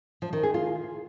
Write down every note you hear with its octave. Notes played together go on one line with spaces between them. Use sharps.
F3
D#3
G#4
F4